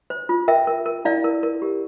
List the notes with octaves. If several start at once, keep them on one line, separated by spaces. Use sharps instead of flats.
C5
F4
A#4 E5 G5
A#4
A#4
E4 D5 F5
A#4
A#4
G4